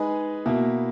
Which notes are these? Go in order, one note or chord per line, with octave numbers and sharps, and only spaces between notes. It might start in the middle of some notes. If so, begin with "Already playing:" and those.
Already playing: G#3 D#4 G#4 B4 D#5
B2 A#3 E4